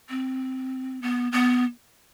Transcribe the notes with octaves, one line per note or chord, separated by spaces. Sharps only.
C4
B3
B3